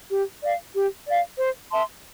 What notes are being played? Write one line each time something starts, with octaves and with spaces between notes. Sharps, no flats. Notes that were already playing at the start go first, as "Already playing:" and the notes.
G4
D5 F5
G4
D5 F5
C5
E5 A5 C6